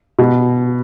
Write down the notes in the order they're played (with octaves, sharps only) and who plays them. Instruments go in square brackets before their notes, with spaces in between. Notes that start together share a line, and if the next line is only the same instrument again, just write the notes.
[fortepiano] B2